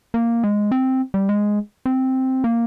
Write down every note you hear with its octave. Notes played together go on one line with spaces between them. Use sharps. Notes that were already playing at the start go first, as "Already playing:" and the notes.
A#3
G#3
C4
G3
G#3
C4
A#3